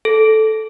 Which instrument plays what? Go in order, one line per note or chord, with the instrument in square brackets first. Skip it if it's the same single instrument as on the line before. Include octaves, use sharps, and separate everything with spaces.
[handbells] A4